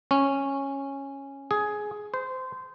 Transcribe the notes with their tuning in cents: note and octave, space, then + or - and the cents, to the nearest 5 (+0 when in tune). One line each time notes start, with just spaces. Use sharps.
C#4 -10
G#4 +10
C5 -20